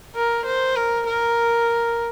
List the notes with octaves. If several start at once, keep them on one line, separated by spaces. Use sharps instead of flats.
A#4
C5
A#4
A#4